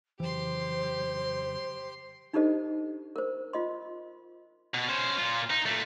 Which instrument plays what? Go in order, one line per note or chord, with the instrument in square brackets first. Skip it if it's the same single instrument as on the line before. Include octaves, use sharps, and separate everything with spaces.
[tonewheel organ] F2 C#3 F#3 [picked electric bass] E3 [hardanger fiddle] G4 C6 [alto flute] C5
[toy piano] D4 D#4 G4 A4 C5 D#5
A#4 C5
F4 D#5 C6
[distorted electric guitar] B2
C#4 C5
A#2 F4
D#4
A#2 A3